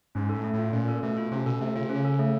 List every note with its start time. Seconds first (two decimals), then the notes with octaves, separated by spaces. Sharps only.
0.15 G#2 C#4
0.29 A2 A4
0.44 A3
0.54 A2 F4
0.73 A#2 C#4
0.88 A4
1.03 B2 A3
1.17 F4
1.32 C3 C#4
1.46 B2 A4
1.61 C3 A3
1.75 C#3 F4
1.84 C3
1.90 C#3 C#4
2.05 A4
2.19 A3